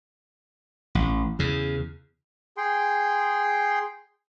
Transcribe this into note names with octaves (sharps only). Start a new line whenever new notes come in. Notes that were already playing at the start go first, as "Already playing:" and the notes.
A1
E2 C#3
G#4 G5 C6